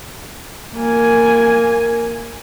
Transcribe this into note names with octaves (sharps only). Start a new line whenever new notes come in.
A#3 G#5